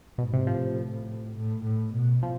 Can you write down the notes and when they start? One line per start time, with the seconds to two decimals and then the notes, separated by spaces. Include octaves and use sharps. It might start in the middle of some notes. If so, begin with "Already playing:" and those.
0.18 G#2 B2
0.33 C3
0.47 A2 F3
1.36 A2
1.64 A2
1.94 B2
2.23 F3